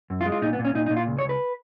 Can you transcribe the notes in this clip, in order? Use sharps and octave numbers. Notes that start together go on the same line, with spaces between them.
F#2
F4
G#3
F4
A#2 D#4
B3
A#2
C#4
A#2 D#4
D#4
A#2
F4
C#2
C#5
C#2
B4